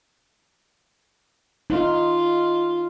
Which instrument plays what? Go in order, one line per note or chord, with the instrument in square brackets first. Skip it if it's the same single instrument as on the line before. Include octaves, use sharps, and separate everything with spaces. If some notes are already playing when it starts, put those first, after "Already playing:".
[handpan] D#4 [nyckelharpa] F4